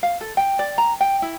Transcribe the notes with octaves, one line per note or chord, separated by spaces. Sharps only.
F5
A4
G5
D5
A#5
G5
E4